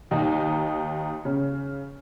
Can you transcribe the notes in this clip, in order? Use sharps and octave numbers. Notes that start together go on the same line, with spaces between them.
D#2 D#4
C#3